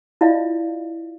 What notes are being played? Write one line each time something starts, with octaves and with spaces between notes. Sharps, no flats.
E4 F4 D5 D#5 F5